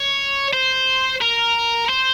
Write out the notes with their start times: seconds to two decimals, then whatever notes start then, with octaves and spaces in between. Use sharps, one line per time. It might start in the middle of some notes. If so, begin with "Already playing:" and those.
Already playing: C#5
0.53 C5
1.22 A#4
1.89 C5